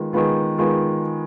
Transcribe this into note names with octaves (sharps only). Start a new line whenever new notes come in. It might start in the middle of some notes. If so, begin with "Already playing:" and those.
Already playing: D#3 G#3 B3 F4
D#3 G#3 B3 F4
D#3 G#3 B3 F4